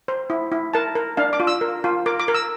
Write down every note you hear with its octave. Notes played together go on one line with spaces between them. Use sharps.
C5
E4
E4
A#4 A5
A#4
D4 F5
D6
F4
E6
A#4
F4
A#4 D6
D6
A#4
E6